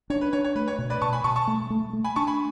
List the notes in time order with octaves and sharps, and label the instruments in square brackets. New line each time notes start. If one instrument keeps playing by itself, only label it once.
[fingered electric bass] D4 [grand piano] C#5
[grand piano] B4
[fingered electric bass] D4 [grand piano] C#5
[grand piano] C#5
[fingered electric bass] A3 [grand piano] B4
[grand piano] C#5
[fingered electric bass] B2
[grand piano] B4 D5
[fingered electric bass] B2 [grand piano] A5 C#6
[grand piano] G#5 B5
[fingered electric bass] B2 [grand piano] A5 C#6
[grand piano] A5 C#6
[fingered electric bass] A3
A3
A3
[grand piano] G#5 B5
[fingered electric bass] D4 [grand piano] A5 C#6
[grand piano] G#5 B5